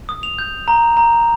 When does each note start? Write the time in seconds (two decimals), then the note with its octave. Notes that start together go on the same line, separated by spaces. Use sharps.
0.09 D#6
0.23 F7
0.39 G6
0.68 A#5
0.97 A#5